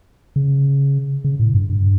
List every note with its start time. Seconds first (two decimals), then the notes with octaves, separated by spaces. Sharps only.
0.36 C#3
1.24 C#3
1.40 A2
1.54 G2
1.70 G2